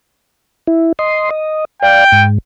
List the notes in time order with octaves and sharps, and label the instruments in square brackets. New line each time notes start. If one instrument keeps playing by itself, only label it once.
[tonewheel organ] E4
D#5 C6
D#5
[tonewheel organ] D5 F5 [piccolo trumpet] G5
[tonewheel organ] G#2